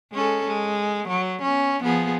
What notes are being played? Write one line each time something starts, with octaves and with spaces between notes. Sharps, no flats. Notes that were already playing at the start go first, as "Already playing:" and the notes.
G#3 C#4 A4
G#3
F#3
B3 C#4
F3 B3 G#4